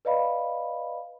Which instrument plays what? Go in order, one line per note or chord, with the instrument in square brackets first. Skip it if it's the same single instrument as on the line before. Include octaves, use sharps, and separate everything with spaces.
[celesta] B4 D5 D#5 F5 B5